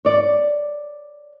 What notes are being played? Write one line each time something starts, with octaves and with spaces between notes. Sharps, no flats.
C#5 D5